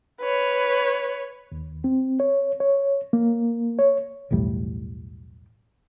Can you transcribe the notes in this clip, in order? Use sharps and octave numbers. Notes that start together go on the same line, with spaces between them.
B4 C#5
D#2
C4
C#5
C#5
A#3
C#5
B1 E2 A2 G3